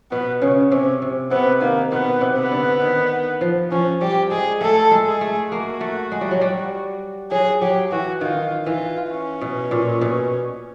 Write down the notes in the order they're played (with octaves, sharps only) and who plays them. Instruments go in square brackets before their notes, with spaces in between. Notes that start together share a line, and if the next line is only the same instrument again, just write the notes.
[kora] B2 [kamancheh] B3
[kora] C#3 [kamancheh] C#4
[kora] C3 [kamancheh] C#4
[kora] C3
[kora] C3 [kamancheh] B3
[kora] D#3 [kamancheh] A#3
[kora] B2 [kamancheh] B3
[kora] C3
[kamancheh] B3
[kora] D3
D#3
F3
[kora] F3 [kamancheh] C#4
[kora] G3 [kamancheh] G4
[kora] G#3 [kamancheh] G#4
[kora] A3 [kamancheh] A4
[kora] G#3
[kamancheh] G#4
[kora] A3
[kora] A#3 [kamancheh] F#4
[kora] A3
G#3
G3
F#3
G3
[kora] F#3 [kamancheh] G#4
[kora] F#3 [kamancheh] G4
[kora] E3 [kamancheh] F#4
[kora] D#3 [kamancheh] F4
[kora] E3 [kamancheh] F4
[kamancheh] C#4
[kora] B2
A#2
B2